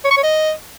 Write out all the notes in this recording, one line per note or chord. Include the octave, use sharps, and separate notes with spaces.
C#5
C#6
C#5
D#5